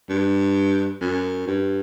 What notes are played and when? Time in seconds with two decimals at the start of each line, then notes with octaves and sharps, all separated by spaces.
0.09 G2
1.01 F#2
1.47 G2